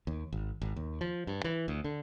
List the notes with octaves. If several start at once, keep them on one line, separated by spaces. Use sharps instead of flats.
D#2
G#1
G#1
D#2
F3
G2
E3
D2
D3